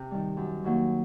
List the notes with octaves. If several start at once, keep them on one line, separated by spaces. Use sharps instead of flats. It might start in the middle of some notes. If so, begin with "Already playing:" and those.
Already playing: C3
D#3 G3
F#2
D#3 F#3 A#3